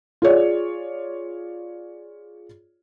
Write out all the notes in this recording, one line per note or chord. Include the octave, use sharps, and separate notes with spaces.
F4 G#4 C#5 D5